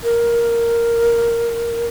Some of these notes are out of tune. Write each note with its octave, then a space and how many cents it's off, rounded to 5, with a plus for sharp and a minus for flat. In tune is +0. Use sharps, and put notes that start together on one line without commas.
A#4 +0